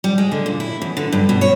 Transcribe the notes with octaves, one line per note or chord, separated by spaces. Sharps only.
G3
G#3
D3
A#2
E4
E2
D3
G2
B2
C#5